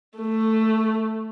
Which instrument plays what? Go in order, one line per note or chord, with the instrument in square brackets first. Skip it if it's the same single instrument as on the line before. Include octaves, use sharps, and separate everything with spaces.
[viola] A3